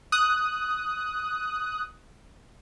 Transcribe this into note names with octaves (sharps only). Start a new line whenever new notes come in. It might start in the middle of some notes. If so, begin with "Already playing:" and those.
D#6 F#6